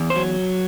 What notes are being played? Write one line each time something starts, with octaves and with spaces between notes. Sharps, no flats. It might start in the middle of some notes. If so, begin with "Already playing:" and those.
Already playing: E2
C5
F#3